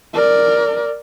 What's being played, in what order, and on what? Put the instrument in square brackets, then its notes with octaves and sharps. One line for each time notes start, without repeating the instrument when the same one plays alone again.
[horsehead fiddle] A#4 D5